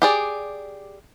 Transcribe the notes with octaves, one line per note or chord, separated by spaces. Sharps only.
G4 G#4 D5